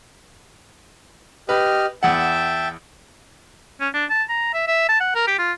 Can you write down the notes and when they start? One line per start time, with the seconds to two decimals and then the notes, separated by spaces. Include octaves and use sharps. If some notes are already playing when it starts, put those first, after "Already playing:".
1.49 G4 B4 D#5 F6
2.03 E2 E5 F#5 G5 A5
3.81 C#4
3.94 D4
4.10 A5
4.29 A#5
4.54 E5
4.68 E5
4.89 A5
5.00 F#5
5.15 A#4
5.27 G4
5.39 F4